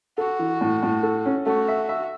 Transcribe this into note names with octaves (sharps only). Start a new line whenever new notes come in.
F#4 A4
E3
A2
A2
A4
C#4
A3 F#4
E5
E5